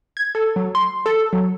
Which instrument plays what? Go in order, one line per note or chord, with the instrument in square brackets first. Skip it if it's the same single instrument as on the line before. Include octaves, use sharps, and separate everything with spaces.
[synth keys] G#6
A4
F#3
C6
A4
F#3